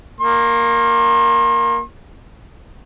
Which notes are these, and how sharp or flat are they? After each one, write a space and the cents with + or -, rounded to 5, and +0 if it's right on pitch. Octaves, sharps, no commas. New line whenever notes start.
A#3 +0 C6 +40